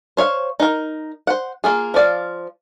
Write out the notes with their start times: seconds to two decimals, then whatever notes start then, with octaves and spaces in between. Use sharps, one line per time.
0.17 C5 C#5 D#5 F5
0.60 D#4 A#4
1.27 C5 F#5
1.64 A#3 F4 G#4
1.94 F3 F4 D5 F5